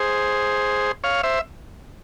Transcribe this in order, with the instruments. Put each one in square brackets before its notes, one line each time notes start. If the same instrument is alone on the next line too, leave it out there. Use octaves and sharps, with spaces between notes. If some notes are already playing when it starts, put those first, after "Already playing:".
Already playing: [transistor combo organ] G#4 C5
C#5 F5
C5 E5